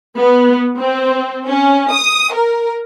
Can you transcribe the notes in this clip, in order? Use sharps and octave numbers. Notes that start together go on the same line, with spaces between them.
B3
C4
C#4
D#6
A#4